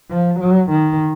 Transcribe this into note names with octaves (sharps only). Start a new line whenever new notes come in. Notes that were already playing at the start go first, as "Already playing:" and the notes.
F3
F#3
D#3